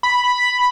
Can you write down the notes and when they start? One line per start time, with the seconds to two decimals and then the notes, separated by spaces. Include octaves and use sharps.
0.03 B5